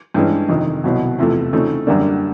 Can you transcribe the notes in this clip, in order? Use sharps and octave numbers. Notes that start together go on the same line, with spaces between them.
G2 E3 G#3 C#4
F2 C3 D#3
C2 B2 F#3
E2 C3 F3 A3
C#3 F3 A3 C4 D#4
F#2 D3 G3 A#3 D4